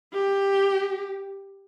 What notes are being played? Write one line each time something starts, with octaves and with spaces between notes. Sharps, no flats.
G4